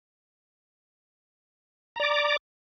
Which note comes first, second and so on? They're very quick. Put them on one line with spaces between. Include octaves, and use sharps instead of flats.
A#5 D5 D6